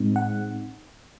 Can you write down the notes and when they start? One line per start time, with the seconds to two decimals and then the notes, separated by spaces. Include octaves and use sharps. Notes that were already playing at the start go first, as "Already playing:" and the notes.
Already playing: A2 G#3 C4 D#4
0.16 F#5